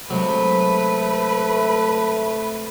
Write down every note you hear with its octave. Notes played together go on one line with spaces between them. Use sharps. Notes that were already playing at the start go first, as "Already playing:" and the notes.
C3 F#3 G#3 A3 B4